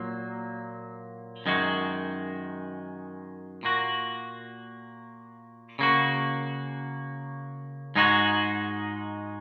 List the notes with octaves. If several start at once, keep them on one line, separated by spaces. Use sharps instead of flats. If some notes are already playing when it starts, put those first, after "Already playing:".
Already playing: A#2 F#3 A#3
F#2 D#3 G#3 F#4
A#2 A#3 F#4
C#3 A#3 F#4
G#2 G#3 D#4 F#4